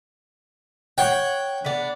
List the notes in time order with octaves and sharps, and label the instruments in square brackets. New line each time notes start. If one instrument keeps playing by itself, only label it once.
[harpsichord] C#5 G5 [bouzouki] F#5
[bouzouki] B3 D4